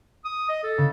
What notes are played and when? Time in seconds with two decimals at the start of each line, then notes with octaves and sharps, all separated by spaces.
0.24 D#6
0.49 D#5
0.63 A4
0.78 C#3